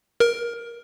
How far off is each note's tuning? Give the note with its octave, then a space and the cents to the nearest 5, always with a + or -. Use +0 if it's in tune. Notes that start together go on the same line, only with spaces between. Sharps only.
A#4 +15